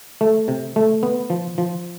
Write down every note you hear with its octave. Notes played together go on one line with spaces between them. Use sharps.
A3
C3
A3
B3
F3
F3